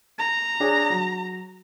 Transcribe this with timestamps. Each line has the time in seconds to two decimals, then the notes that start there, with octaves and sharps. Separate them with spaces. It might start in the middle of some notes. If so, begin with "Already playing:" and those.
0.19 A#5
0.60 D4 G#4 C#5
0.90 F#3